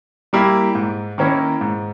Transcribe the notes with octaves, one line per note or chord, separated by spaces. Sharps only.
G3 A#3 E4 G4
G#2
D#3 A#3 C#4 E4
G#2